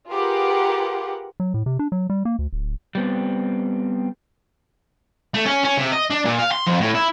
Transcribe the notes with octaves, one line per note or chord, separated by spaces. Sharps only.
F4 G4 G#4 A#4 B4 F#5
F#3
A2
C3
D4
F#3
G3
A#3
D2
D1
G3 B3 C4
A3
C#4
C#4
C3
D#5
D4
A#2
F5
C6
F2
A2
E4